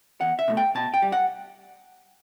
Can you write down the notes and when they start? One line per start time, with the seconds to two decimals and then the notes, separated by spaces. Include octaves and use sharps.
0.21 E2 F#5
0.39 E5
0.48 B2 A3
0.57 G5
0.75 B2 A5
0.94 G5
1.02 G3
1.12 F#5